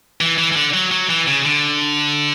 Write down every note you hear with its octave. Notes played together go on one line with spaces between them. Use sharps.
E3
E3
E3
D3
F#3
F#3
E3
C#3
D3